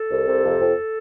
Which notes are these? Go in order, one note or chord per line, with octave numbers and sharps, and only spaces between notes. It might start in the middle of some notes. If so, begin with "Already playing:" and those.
Already playing: A4
C2
C3
F2
F2